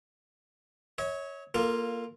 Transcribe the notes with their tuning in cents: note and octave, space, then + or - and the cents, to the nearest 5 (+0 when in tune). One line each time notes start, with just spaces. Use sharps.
C#5 +0 E5 -45
A#3 +5 F4 +0 A4 +25